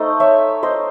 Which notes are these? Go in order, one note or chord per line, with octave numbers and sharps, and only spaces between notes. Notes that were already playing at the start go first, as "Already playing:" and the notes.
Already playing: A3 D#4 C5 D#5
C#5 E5
C5 D#5